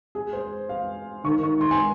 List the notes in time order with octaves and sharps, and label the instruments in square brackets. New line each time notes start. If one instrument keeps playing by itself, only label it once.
[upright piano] G#4
C5
F5
[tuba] D#3 [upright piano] C#6
[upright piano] C#6
C6
G#5